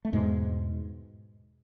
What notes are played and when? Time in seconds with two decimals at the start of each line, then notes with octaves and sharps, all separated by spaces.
0.05 A3
0.12 E2 G#2 B2 G#3